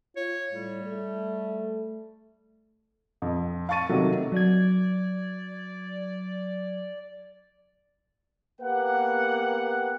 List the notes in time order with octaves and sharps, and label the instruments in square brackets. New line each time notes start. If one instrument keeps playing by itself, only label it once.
[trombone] F4 [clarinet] C#5
[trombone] A2 [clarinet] G3
[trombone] A3
[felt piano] F2
F5 A5 C#6 A6 D#7
C3 D#3 F#3 A3
[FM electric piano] F#3 G#6 [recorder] D5
[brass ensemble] A#3 B3 G4 B4 F#5